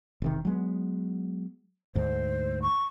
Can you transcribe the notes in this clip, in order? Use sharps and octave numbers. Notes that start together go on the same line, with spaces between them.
E1 C3 D#3
F#3 G#3 B3
D2 G#2 C5
C#6